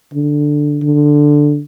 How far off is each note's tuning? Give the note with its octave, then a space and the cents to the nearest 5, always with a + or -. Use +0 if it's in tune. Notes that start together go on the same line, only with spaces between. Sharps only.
D3 +5
D3 +5